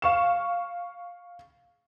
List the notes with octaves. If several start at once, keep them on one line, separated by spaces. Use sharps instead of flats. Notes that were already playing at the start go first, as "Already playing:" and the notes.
F5 C#6 E7